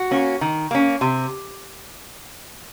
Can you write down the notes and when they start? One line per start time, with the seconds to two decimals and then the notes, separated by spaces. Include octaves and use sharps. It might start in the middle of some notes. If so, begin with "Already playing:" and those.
Already playing: F#4
0.11 A#3 C#4
0.41 D#3
0.71 A#3 C#4
1.01 C3